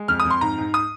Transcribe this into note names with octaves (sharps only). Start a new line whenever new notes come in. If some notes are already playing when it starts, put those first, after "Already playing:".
Already playing: G#3
F2 F6
D#6
F2
C6
G#2 A#5
G#2
D#6